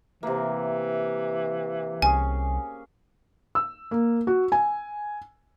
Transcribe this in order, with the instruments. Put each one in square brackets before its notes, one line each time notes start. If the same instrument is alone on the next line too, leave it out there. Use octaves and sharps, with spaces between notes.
[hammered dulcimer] C3 A#3 [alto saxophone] E3
[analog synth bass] C2 [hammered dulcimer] C#4 G#4 [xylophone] G#5
[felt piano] E6
A#3
F#4
G#5